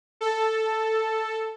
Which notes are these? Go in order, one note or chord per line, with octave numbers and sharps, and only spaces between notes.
A4